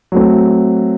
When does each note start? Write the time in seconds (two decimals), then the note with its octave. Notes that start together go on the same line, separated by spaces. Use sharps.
0.12 F#3 A3 C4